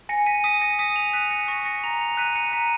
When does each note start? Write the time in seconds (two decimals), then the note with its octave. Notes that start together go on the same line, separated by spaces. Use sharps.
0.09 G#5 A#6 C#7
0.26 B6 D#7
0.44 D#6 B6 D#7
0.61 A#6 C#7
0.79 D#6 B6 D#7
0.96 C#7 F7
1.13 F#6 B6 D#7
1.30 A#6 C#7
1.48 C#6 A#6
1.65 A#6 C#7
1.83 A#5 C#7 F7
2.01 C#7 F7
2.17 F#6 B6 D#7
2.36 C#7 F7
2.52 A#5 B6 D#7